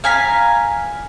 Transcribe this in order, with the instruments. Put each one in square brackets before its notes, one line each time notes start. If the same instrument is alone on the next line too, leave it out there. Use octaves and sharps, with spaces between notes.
[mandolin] F5 G#5 A#5 B5